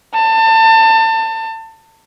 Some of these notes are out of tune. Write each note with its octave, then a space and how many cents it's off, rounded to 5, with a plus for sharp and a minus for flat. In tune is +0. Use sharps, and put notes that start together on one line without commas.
A5 +30